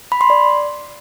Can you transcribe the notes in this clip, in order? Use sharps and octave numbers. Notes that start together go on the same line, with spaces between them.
B5
C6
D5